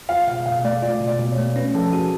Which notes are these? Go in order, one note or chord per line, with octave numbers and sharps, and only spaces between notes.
F4 F5
B2 F5
B2 F5
A3 D5
F4 D5
B2
D5
B2
C#5
A3
C#4 B4
F3 A4
F#4 G#4